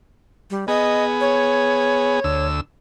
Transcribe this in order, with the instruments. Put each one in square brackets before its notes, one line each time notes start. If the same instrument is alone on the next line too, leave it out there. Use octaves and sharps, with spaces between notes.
[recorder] G3
[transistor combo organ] B3 G#4 [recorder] D#5
[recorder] C#5
[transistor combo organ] D2 E6